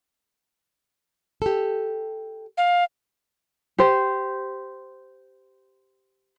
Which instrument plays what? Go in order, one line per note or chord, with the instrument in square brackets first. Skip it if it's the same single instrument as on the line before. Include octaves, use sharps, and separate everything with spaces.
[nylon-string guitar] G4 A4
[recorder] F5
[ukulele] G4 C5